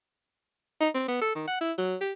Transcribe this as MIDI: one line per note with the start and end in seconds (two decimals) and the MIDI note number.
0.80 0.89 63
0.94 1.05 60
1.08 1.18 59
1.21 1.33 69
1.35 1.45 51
1.47 1.58 78
1.61 1.72 64
1.78 1.96 54
2.01 2.12 67